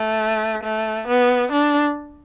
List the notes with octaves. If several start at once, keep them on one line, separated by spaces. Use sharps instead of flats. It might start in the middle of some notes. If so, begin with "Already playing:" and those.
Already playing: A3
A3
B3
D4